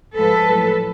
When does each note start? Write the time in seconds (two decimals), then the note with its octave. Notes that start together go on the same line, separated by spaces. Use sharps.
0.18 G#2 F3 G#3 A4 B4
0.48 A2 F#3